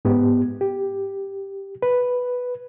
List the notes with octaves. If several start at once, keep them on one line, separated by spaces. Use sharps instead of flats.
G#2 B3 G4
G4
B4